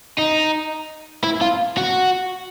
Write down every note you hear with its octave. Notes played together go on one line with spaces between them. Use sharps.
D#4
E4
F4
F#4